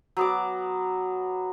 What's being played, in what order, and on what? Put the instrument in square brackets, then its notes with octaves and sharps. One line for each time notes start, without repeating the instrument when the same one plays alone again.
[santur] F#3 B3 D6